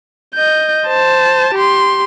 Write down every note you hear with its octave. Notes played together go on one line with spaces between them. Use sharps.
D#5 G6
C5 A5
G4 C6